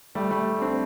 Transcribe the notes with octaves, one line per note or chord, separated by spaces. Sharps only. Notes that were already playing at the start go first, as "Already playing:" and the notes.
G3 A3
G3 A3
C4 D4